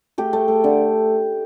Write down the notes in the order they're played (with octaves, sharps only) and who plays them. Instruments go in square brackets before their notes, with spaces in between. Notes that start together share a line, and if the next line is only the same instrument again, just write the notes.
[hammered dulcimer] A3 G4
A3
A3
D3